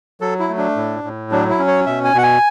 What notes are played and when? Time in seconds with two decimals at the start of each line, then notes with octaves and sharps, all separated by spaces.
0.21 F#3 A4
0.39 E4
0.49 A3
0.58 D4
0.76 A2
1.04 A2
1.31 F#3 D4
1.50 E4
1.59 C#4
1.67 C#5
1.86 B2 E5
2.04 G#5
2.14 B2 F#5
2.23 G#5